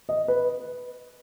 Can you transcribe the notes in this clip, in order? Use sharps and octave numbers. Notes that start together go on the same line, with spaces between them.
D#5
B4